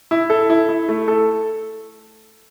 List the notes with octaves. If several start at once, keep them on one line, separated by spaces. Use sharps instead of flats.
E4
A4
E4
E4
A3
A4